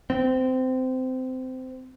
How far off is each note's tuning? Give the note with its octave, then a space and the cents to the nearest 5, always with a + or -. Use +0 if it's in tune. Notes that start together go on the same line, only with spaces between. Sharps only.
C4 -20